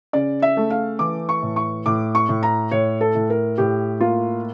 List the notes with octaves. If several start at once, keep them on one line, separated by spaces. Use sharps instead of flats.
C#3 D5
E5
A3
F5
E3 D6
C#6
A2
C#6
A2 D6
C#6
A2
A#5
A2 C#5
A4
A2
A#4
A2 G4
A#3 F4